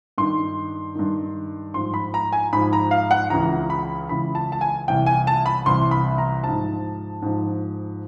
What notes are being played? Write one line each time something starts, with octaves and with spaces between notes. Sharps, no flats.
G2 D#3 C6
G2 D#3
G#2 F3 C6
B5
A#5
G#5
G#2 F3 B5
A#5
F5
F#5
C#2 C#3 E3 A#5
B5
C#2 C#3 E3 B5
A5
A5
G#5
C2 C3 E3 G5
G#5
A5
B5
C2 C3 E3 C6
B5
A#5
G#2 F3 A5
G#2 F3